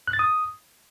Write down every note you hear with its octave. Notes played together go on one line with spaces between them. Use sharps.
F#6
A6
D#6